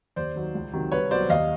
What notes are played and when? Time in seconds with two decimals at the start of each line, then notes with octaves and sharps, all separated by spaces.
0.16 D#2 C5 D5
0.36 D#3 F#3
0.55 C#2
0.73 C3 D#3 F#3
0.92 C2 B4 C#5
1.11 B2 F#3 C5 D5
1.30 D#2 D#5 F5